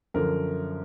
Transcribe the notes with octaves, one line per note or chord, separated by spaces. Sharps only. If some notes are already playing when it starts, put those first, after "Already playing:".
F#2 D3 F3 A#4